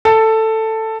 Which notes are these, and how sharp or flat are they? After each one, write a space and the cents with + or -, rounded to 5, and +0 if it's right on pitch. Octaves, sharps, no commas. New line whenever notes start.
A4 +10